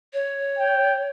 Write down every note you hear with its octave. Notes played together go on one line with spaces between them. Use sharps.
C#5
G5